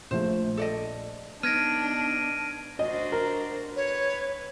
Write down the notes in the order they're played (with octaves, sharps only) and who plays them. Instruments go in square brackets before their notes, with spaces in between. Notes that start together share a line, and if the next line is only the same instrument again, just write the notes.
[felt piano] A#1 F3 A3 [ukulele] C5
[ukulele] A4 D5 D#5
[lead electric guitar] B3 D#4 [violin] D4 [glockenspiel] F6 G#6 A#6 [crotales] D7 D#7
[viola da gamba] D4 F#4 C5 [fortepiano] D#5
[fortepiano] A#4
[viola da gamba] B4 [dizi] C#5